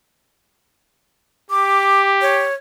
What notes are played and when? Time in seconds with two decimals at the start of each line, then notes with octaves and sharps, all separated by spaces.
1.50 G4 D6
2.22 C#5